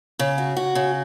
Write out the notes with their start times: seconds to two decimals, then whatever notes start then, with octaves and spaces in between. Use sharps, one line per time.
0.19 C#3
0.38 F#4
0.56 F#4
0.75 C#3